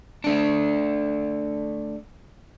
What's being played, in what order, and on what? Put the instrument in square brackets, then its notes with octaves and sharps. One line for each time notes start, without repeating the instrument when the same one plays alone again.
[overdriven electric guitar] A3 D4